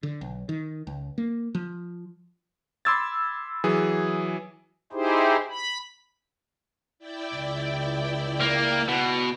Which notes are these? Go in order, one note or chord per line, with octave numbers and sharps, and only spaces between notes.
D3
B1
D#3
C#2
A#3
F3
B5 C6 D6 E6 G#6 A6
E3 F#3 G#4
D#4 E4 G4 G#4 C5
B5
E4 D5 G5
C#2
A#3
B2